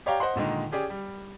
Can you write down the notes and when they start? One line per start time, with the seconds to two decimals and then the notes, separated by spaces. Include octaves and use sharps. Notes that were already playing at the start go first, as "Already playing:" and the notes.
0.06 G4 C#5 D5 F5 G5 A#5
0.20 C5 D#5 F#5 C6
0.36 A#2 D3 D#3 G#3
0.72 C#4 G4 G#4 D5
0.90 G3